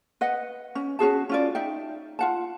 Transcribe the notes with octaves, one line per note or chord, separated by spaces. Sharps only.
B4 D#5 F#5
C#4
C#4 F#4 G#4 A5
C#4 F4 D5
D#4 E5 G5
F4 F#5 A5